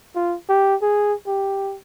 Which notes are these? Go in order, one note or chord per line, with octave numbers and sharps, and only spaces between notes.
F4
G4
G#4
G4